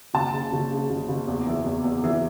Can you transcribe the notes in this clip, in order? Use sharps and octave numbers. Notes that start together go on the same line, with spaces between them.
F#1 A5
C#3
F#1
C#3
F#1
F#1
E2
E3
E2
E2
E3